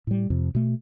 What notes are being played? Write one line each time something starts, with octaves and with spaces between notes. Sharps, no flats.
A2 G3
F2 C3
B2 A3